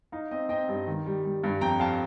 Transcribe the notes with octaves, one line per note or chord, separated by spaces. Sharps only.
D#4 F5
C4 D#5
C4 D#5 G5
G2
D#3
G3
G3
G2
F2 G5 A#5
F2 F5 A5